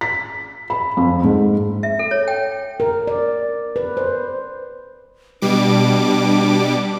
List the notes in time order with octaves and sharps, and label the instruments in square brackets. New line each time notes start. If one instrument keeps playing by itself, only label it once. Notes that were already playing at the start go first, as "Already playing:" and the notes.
[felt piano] B6
B5
F2
G#2
[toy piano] E5
A4
C#5
G5
[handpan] A#4
D5
B4
C5
[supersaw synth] B2 G3 D6 [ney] D4